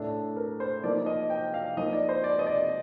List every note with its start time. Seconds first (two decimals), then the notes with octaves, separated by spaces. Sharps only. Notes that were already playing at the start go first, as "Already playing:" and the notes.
Already playing: A2 A3 D4
0.37 A#4
0.60 C5
0.83 F3 A#3 D#4 D5
1.06 D#5
1.30 G5
1.54 F5
1.77 F3 A#3 D#4 D#5
1.93 D5
2.09 C5
2.24 D5
2.39 D#5
2.47 D5